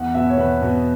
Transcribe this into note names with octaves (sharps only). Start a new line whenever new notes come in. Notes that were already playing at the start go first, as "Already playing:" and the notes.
Already playing: E2 F#5
B2 B3 E5
C#5
E2 B4
B2 B3